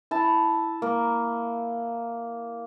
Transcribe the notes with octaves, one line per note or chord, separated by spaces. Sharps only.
E4 A5
A#3